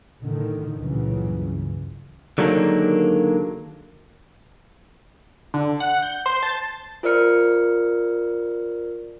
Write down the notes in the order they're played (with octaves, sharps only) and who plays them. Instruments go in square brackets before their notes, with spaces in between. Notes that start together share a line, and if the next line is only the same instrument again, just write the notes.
[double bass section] A2 D3 D#3
C#2 G2 A#2 C#3 E3 F#3
[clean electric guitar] D3 D#3 F#3 G#3 A#3 D4
[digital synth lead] D3
F#5
G6
C5
A5
[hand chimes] F4 A#4 C5 D5 F6 C#7